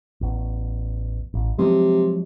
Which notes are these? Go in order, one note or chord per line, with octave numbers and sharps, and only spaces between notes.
A1 E2
A1
C3 F3 F#3 G#3